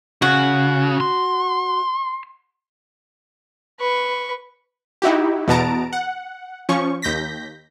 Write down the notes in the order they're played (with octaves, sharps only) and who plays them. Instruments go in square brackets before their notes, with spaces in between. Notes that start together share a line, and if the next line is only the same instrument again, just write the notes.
[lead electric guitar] C#3 [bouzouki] F#4
[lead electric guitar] C6
[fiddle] B4 C#6
[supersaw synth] D#4 E4 F#4 G4
E2 B2 B3 A5 A#5 D7
F#5
F3 C#4 C#6
D#2 G6 A#6 B6